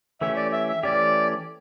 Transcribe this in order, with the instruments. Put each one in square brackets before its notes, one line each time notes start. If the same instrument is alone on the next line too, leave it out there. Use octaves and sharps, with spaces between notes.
[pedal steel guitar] E3 A3 C#4 G4 [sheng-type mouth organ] E5
[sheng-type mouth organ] D5
E5
E5
[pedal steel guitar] E3 A3 C#4 G4 [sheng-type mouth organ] D5